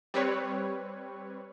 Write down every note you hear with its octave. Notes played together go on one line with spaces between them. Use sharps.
G3 C4 B4 C#5